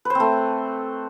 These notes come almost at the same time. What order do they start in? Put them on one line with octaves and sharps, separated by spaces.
B4 C5 C4 A3